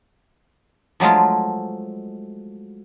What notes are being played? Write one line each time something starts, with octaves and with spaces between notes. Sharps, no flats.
F3 F#3 G#3 A3 F4